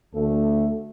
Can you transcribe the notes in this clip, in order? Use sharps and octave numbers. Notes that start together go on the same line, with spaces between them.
D2 A3 A4